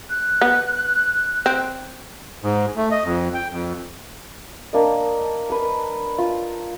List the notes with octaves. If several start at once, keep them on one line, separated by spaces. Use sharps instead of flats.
F#6
B3
C4
G#2
A3
D#5
F2
G5
F2
A#3 D4 A#4 D#5
A#4 B4
F4